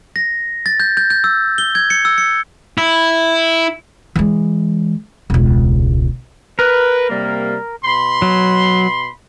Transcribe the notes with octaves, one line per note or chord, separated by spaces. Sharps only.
A#6
A6
G6
G6
G6
E6
G7
G#6
C#7
E6
C#7
E4
E3 G#3
E1 C#2
A#4 B4
C3 G3 A#3
B2 B5 C6
F#3